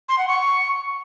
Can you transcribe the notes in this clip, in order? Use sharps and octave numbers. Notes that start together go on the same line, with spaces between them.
C6
F#5
C#6